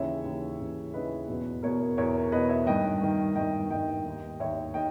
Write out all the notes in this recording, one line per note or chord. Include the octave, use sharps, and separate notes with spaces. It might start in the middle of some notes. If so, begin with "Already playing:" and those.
Already playing: D#2 C#3 E3 C#5 E5
D#2 C#3 E3
D#2 C#3 E3
D#2 C#3 E3 B4 D#5
E2 B2
E2 B2 A#4 C#5
E2 B2 A#4 C#5
E2 B2 B4 D#5
C#5 E5
G2 D#3 D#5 G5
G2 D#3
G2 D#5 G5
D#3
G2 D#3 D#5 G5
D#2 D#3
D#2 D#3 C#5 E5
D#3 D#5 G5